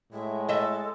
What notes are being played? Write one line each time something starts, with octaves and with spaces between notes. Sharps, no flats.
A2 G#3 E5
A4 D#5 E5